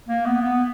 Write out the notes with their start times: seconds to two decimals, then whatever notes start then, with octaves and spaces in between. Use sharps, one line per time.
0.09 A#3
0.25 B3
0.41 B3